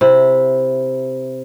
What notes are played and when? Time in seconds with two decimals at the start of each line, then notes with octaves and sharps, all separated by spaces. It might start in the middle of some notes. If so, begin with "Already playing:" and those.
0.01 C3 E4